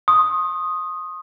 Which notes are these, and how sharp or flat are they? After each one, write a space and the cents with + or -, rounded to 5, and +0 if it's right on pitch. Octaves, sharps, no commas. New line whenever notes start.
C6 +40 D#6 +0